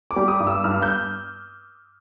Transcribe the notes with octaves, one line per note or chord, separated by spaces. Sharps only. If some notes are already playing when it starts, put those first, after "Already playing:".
D6
G3
D#6
G2
E6
G2 F6
G6